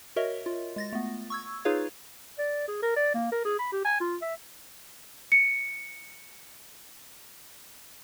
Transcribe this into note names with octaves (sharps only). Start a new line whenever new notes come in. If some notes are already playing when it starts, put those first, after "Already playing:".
F#4 A#4 C#5 D#5 E5
F4
G#3 A6 A#6
A3 B3
C#6 E6 G#6
D#4 F4 G#4 B4 C#5 F5
D5
G#4
A#4
D5
A#3
A#4
G#4
B5
G4
G#5
F4
E5
C#7 D7